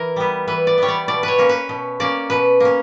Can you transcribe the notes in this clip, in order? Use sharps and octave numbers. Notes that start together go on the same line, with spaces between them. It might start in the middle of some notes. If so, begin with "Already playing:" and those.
Already playing: E3 E4 A#4
G3 B3
E3 B4
D5
G3 B3 C#5
D5
B2 D5
B4 C#5
A#3 C#4
B4
B2
A#3 C#4 D5
B2 B4
A#3 C#4